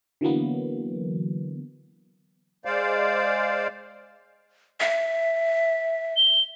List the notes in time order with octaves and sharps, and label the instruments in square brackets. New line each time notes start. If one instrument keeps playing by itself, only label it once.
[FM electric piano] D3 E3 F#3 A#3 B3
[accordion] G#3 C5 D5 F5
[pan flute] E5
[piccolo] G7